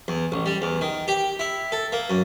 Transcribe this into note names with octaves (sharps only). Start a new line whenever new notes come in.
E2
A1
G3
E2
D#3
G4
E4
A4
A#3
F#2